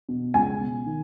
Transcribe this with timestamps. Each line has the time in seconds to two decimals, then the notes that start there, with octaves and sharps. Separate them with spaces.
0.09 B2
0.34 C#2 G#5
0.60 B2
0.86 D#3